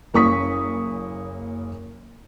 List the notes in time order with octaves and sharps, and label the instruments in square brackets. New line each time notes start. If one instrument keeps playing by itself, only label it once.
[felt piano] F#1 A#3 C#4 C#6 D#6 B6